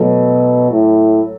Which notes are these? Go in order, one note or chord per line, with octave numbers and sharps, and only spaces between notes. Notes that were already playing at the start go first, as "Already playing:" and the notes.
Already playing: B2 F#3 A3
A2